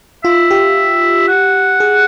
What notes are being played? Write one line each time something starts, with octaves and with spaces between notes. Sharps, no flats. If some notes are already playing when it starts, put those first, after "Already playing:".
F4 E5
G4
F#5
G#4